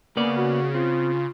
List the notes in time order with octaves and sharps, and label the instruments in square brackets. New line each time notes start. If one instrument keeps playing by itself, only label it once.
[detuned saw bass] C#3 [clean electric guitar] A#3 B3 D5
[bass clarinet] F#4
[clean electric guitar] C4 [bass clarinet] F4